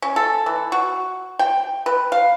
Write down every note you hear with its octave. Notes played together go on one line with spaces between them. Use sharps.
C#4
A4
E3
F#4
G5
B4
F5